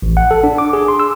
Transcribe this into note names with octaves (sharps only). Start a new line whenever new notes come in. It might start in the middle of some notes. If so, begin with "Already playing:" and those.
A1
F#5
A4
D4
D6
G#4
C6
E6